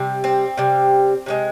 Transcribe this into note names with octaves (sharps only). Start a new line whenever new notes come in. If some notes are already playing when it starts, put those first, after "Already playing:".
Already playing: C3 G3
C4
C3 G3
C3 F3 G#3